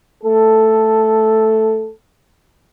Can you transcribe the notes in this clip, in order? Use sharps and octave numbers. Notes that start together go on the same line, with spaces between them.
A3 A4